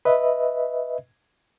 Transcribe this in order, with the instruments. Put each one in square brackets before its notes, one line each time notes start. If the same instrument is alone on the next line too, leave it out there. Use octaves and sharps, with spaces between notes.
[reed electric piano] B4 D#5 E5